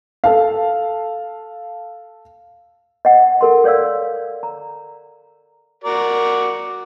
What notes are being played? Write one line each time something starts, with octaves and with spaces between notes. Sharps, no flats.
A4 F5
D#5 F#5
A4 A#4 C6
A4 C#5 D5 F5 E6
A#5
F#4 A#4 D5